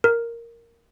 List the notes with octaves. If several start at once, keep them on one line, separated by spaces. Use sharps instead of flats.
A#4